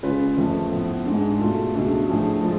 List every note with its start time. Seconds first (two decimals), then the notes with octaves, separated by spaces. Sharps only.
0.03 C#3 G#3 C#4 F4 B4
0.37 F2 F3 A3
0.71 A2 F3 B3
1.05 G#2 G#3 D4
1.39 B2 A3 F4
1.74 C#2 B2 A3 D4 G#4
2.08 A2 F3 A3 D4 G#4
2.43 F3 G#3